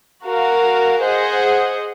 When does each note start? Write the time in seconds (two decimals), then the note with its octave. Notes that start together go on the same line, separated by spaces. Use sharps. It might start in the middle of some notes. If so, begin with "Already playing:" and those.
0.25 F#4 A#4 F5
1.00 G#4 C5 D#5 F#5